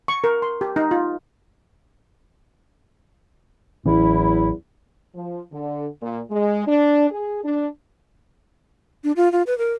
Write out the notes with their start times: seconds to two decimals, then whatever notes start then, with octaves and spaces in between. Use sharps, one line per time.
0.08 C#6
0.24 A#4
0.42 C6
0.61 G4
0.76 D#4
0.91 F4
3.86 A1 E2 E3 F#3 C#4 E4
5.14 F3
5.52 D3
6.01 A#2
6.31 G#3
6.66 D4
7.10 G#4
7.44 D4
9.04 D4
9.16 F4
9.32 F4
9.47 B4
9.58 A#4